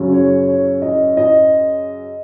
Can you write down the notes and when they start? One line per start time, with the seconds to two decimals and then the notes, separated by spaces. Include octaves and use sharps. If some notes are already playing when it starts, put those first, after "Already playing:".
Already playing: F#2 C#3 F#3 C#4
0.12 C#5
0.47 C#5
0.82 D#5
1.17 D#5